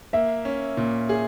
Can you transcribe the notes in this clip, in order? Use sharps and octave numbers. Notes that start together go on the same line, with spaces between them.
A#3 E5
C#4
A#2
G#4